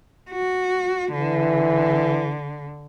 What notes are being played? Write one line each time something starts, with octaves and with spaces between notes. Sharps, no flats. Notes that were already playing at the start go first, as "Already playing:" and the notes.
F#4
D3 E3